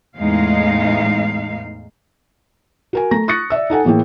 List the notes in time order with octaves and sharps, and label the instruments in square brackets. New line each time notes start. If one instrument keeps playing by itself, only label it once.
[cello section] E2 A2 G#3 D#4 F5
[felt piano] F#4 A#4 G#5
A3 A#5 A#6
C#6 D#6 F#6 A6 A#6 C#7
D5 E5 E6
D#4 A4 F#5 G#5
A2 E3 A#3 G#4 G5